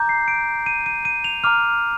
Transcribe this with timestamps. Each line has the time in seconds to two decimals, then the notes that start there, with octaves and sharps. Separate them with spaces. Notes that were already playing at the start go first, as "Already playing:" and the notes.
Already playing: A#5 D6 G6
0.09 C7
0.28 D7
0.66 D#7
0.86 D#7
1.05 D#7
1.24 F7
1.44 A#5 D6 F6 F7